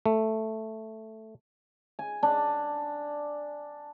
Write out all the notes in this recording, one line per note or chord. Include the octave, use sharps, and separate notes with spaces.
A3
G#5
D4